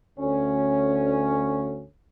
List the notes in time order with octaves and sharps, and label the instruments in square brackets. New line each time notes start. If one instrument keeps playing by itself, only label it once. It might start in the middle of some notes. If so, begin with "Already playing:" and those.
[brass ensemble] D2 C#4